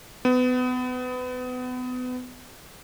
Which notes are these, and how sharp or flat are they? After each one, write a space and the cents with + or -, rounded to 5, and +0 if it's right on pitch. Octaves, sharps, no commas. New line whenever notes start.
B3 +30